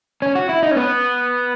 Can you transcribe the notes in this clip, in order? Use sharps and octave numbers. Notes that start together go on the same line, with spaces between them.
C#4
F#4
E4
D#4
C#4
B3